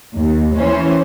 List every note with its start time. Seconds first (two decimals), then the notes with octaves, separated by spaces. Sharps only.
0.16 D#2
0.57 E3 C#4 C5